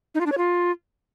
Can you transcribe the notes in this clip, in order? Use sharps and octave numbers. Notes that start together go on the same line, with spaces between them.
D#4
F4
D4
C#5
F4